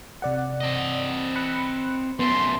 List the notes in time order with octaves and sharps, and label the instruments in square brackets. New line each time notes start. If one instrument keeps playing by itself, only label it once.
[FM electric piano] C3 D5 F#5
[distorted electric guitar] C4 D#5
[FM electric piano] B5 F#6 C#7
[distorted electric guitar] F#2 A3 [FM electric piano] B3 [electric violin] C6